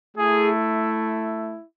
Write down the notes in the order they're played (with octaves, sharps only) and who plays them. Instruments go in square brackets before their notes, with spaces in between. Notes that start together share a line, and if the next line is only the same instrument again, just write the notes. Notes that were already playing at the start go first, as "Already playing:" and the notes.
[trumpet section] A3 E4 G#4